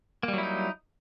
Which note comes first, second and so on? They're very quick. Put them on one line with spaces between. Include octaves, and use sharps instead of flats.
A#3 G3 F#3 E4 D#4